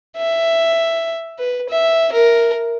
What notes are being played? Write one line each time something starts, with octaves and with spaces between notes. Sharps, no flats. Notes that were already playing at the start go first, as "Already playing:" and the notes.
E5
B4
E5
A#4